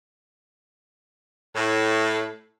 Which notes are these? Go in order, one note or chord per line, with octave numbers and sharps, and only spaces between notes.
A2